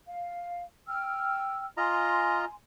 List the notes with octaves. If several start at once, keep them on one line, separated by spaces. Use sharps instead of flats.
F5
G5 E6 F6
F4 D#5 G#5 A#5 C6